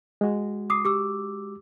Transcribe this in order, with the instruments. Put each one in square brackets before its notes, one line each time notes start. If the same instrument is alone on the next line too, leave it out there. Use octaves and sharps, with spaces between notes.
[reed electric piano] G#3 F#4
[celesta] D6 D#6 C7
G4 D6 E6